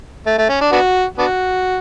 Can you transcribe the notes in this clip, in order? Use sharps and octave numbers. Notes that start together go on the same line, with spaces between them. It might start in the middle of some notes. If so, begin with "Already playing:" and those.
A3
A3
C#4
D4
B3 D4 F#4
B3 D4 F#4